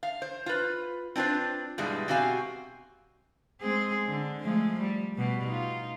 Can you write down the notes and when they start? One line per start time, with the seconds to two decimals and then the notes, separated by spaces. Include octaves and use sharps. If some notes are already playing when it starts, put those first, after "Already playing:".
0.03 F5
0.22 C5
0.46 F4 B4
1.16 C4 D4 F4 B4 C5
1.78 G2 B2 E3 G3 G#3
2.08 B2 C4 F#4 G4 F5 G#5
3.61 G#3 C4 G#4
4.07 D3
4.43 F3 G#3 A3
4.80 G3
5.16 B2 G3
5.46 D#4 F4